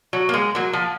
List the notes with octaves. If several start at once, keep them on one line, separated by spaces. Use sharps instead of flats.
F#3
A#3
G#3
F#3 A#3
F3